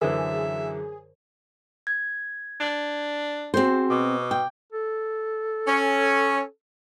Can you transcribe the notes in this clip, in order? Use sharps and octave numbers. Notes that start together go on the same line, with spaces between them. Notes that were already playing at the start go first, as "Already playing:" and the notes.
F#2 D3 E3 G#4 A#4 C5 E5
G#6
D4
C4 F#4 G#4 C5
B2 D6
G5
A4
C#4